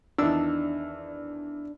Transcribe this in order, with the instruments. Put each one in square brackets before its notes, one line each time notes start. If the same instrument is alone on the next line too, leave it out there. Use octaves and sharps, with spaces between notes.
[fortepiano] E2 D#3 E6 [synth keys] D4